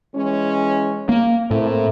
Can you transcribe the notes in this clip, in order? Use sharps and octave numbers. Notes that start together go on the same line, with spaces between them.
E3 G#3 C#4
A#3
A2 A#3 C4 A4